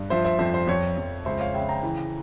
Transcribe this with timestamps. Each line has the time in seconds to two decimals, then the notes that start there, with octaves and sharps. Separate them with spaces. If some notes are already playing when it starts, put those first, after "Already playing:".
Already playing: G2
0.10 F3 C5 E5
0.24 C5 E5
0.39 F2 C5
0.54 C5
0.67 F2 C#5
0.97 F2
1.25 C#2 C5 E5
1.39 C#5 F5
1.54 C#3 E5 G5
1.69 G5 A#5
1.83 E3